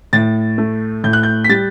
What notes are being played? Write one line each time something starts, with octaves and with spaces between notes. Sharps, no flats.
A2 A6
A3
A2 G6
F#6
G6
B6
G3 A6